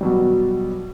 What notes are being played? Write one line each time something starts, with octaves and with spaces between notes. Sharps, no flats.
B2 F#3 G3